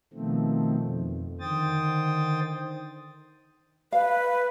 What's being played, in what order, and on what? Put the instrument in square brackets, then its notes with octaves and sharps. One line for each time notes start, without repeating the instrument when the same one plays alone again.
[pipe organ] B2 D#3 F3 A3 C4
F2
D3 D#3 C5 G5 D#6 A6
[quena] B4 [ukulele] F5